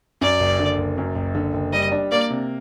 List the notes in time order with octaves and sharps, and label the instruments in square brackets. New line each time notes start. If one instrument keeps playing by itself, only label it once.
[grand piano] F#2 [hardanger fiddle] D5
[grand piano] F#1
D3
F#1
F#2
F#1
D3
F#1
[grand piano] G3 [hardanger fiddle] D#5
[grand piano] D4
[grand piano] A#3 [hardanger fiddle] D5
[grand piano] C3